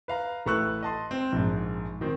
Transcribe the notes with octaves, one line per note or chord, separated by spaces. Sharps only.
B4 F5 A#5
A1 A3 B4 C#6 E6 F#6
D#5 A5 C6
C4
A#1 G#2
D#3 C4